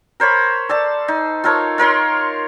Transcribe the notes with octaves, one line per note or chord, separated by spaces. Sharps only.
A#4 C5 C#5 B5
A4 D5 A5
D#4
F4 A4 A#4 C#5
F4 A#4 C#5 C6